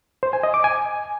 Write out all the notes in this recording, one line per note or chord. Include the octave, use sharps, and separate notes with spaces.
C5
G#5
D#5
D6
G#5